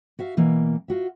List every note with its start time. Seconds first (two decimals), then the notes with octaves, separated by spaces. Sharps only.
0.19 F#4 E5 F5
0.37 B2 E3 A#3
0.88 F4 F#4 E5